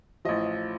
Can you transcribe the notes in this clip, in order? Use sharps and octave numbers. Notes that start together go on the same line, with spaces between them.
A1 A2 F3 D#5